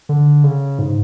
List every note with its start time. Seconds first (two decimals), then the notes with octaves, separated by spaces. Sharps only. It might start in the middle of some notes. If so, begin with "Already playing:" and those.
0.09 D3
0.44 C#3
0.79 G#2